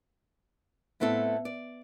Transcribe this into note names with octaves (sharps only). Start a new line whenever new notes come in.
A2 B3 C4 E4 A4
D5